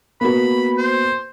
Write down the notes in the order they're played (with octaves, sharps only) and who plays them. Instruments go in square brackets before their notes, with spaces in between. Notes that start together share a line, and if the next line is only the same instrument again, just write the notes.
[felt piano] A#3 B3 F#4 [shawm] B5
[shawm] C5